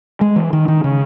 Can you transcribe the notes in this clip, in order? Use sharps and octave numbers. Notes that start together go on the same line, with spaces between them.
G#3
E3
D#3
D#3
C#3